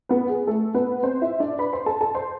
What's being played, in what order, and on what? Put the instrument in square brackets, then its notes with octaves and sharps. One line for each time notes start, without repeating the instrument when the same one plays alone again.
[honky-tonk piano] B3 B4
G#4
A3 A4
B3 B4
C4 C5
E4 E5
D4 D5
B4 B5
C5 C6
A4 A5
A4 A5
C5 C6